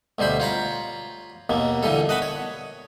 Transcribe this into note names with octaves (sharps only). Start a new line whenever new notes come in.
D2 B2 G3 C5 B5
F4 C#5 A#5 B5
D#2 B2 A#3
A#2 D3 E3 G3 A4
D#5 F#5 A5 B5 C#6
C#5